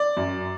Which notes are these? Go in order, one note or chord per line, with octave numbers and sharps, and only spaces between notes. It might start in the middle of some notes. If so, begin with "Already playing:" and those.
Already playing: D5
F#2